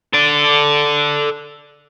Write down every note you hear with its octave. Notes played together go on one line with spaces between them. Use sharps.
A4 D5